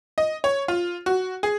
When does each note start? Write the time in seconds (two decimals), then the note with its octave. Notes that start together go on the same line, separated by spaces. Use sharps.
0.18 D#5
0.44 C#5
0.68 F4
1.06 F#4
1.43 G#4